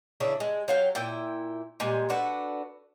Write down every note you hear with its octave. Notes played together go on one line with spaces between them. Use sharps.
C#3 E3 D4 E4
G#3
F#3 F5 G5
A#2 E4 G5
A#2 G3 G#3
D4 F#4 A4 B4